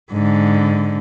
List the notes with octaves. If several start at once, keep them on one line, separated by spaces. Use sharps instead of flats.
G#2 D3